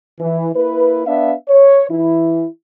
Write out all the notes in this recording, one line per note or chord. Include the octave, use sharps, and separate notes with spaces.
E3
A#3 E4 B4
B3 D4 E5 F5
C#5
E3 E4